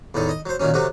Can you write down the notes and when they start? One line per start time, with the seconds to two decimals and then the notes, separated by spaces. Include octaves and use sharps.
0.14 E2 A2 D#3 A4
0.29 D#5
0.46 F#3 C5
0.60 A#2 D#3 F#3 C#4
0.74 C3 F#3 A3 F#4